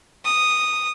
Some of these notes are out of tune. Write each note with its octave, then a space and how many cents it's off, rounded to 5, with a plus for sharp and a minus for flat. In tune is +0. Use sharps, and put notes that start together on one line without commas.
D#6 -10